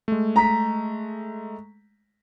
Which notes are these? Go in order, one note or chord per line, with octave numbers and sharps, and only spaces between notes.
G#3 A3
A#5 B6